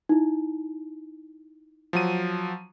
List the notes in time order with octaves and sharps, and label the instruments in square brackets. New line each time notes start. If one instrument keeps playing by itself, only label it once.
[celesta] D#4 E4
[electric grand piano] F3 F#3 D#7